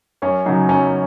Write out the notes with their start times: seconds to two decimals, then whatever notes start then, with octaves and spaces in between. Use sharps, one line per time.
0.22 F#2 C#4 C#5
0.46 C#3 F#3 D#4
0.69 F#2 C#4 C#5